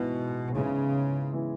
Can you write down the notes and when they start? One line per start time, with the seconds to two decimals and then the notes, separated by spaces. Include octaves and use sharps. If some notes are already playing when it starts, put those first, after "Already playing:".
Already playing: G#2 B2 E3 G#3 B3 E4
0.55 G#2 C#3 E3 G#3 B3 E4
1.32 E3 G#3 B3 E4